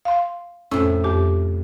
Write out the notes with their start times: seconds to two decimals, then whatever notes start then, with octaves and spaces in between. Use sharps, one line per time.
0.05 F5 C6
0.71 F2 A2 C3 C#4 E6
1.04 F2 G4 D6